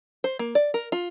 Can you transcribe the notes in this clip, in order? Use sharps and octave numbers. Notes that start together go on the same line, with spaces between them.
C5
A#3
D5
A#4
F4